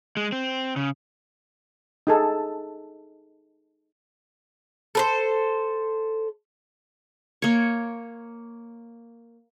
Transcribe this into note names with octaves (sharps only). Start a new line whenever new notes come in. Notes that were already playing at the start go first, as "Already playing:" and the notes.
G#3
C4
C#3
D#4 G#4 A4 A5
A4 B4 C5
A#3 C#5